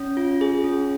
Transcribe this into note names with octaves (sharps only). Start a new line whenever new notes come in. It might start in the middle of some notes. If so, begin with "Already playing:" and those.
Already playing: C#4
F4
G#4
C#4